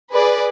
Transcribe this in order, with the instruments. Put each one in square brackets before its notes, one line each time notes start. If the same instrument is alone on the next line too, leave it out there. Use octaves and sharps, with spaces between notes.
[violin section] G#4 B4 D5